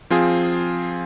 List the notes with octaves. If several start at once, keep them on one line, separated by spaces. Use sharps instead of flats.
F3 C4 F4 G#4